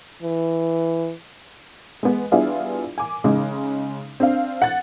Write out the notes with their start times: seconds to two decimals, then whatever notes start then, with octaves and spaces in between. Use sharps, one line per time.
0.23 E3
2.03 G#3 B3
2.32 G3 B3 D4 E4 F4 G#4
2.98 G#5 D6
3.24 C#3 G#3 D#4
4.20 C4 D4 F5
4.62 F#5 A6